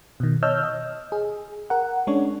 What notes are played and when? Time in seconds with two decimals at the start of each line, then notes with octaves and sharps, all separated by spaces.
0.20 B2 D#3
0.43 C#5 D#5 A5 E6 F6 G6
0.64 D#5
1.12 G#4
1.70 A#4 F#5
2.07 G#3 C#4 D4 C#5